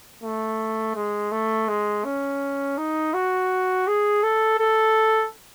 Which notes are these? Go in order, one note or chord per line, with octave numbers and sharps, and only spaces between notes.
A3
G#3
A3
G#3
C#4
D#4
F#4
G#4
A4
A4